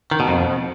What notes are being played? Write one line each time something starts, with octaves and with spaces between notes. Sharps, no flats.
D#3
B2
F2